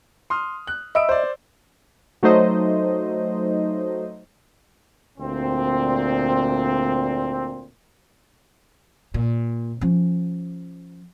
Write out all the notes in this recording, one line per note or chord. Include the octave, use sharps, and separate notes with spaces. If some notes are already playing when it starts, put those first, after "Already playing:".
C6 D#6 F6
F#6
D#5 E5 B5 E6 D7
C5 D5
F#3 A3 D#4 C5 D#5
D2 A#2 C4
A#2
F3 C#4